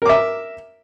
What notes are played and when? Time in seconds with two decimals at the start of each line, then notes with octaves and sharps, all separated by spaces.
0.02 A#4
0.06 D6
0.09 E5